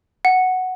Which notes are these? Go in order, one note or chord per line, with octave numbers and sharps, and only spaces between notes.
F#5